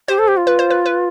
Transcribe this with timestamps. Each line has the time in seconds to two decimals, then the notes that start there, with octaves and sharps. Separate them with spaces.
0.08 G4 C5
0.19 A4
0.28 G4
0.37 F4
0.47 B4
0.59 C5
0.71 B4
0.86 B4